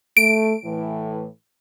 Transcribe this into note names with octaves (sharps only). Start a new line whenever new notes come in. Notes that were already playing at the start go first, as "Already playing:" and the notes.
A3 D7
A2 E3